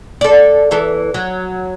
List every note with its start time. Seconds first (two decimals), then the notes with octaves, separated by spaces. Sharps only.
0.21 A4 D5
0.71 E2 E3 A4
1.14 F#3